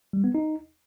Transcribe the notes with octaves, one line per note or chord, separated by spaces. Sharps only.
G3
B3
D#4